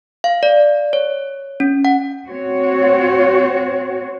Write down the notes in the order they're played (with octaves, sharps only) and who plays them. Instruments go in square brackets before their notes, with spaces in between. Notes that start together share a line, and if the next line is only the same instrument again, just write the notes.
[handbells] F5
D5
C#5
C#4
F#5
[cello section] C4 F#4 C#5